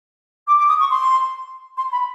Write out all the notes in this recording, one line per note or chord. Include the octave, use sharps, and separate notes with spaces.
D6
D6
D#6
C#6
C6
C6
B5